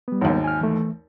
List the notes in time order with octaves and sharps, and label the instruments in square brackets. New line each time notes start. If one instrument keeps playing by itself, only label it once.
[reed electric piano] G3 B3
[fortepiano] G#1 D#2
[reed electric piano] G#5 F6
E3 A3